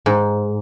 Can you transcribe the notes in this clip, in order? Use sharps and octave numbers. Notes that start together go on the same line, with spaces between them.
G#2